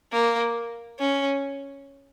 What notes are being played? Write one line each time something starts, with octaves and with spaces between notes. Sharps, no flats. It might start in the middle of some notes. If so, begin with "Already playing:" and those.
A#3
C#4